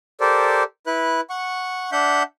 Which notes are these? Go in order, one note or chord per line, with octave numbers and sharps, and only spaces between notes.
G4 A4 A#4 C5 D5
E4 B4 F#6
F#5 C#6
D4 E5 F#5 G6